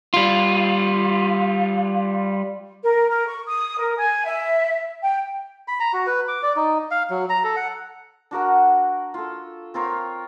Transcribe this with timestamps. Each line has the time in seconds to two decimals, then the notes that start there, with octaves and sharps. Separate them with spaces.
0.14 G3 F4
2.84 A#4
3.08 A#4
3.27 C#6
3.46 D#6
3.79 A#4
3.98 G#5
4.26 E5
5.03 G5
5.68 B5
5.80 A#5
5.93 F#4
6.07 B4
6.28 D6
6.43 D5
6.56 D#4
6.91 F5
7.10 F#3
7.29 A#5
7.44 A4
7.56 F#5
8.31 D4 F#4 A#4 F#5
9.14 F4 A4
9.74 C4 F4 A#4 C#5